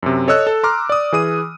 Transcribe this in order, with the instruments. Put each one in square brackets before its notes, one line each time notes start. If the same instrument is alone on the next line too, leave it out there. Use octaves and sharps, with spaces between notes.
[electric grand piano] F#2 C3
A4 C#5 D#5 E6 F#6
A4
A#5 C6 D6 F6
D5 D#6
E3 G#4 D#6 D#7